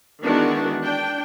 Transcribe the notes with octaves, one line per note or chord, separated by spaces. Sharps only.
D#3 E3 G#3 B3 D4 F#4
D4 G5